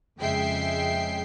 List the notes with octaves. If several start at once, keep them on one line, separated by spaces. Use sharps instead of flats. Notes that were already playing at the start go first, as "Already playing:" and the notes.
F2 C#3 G#3 E5 G5 C7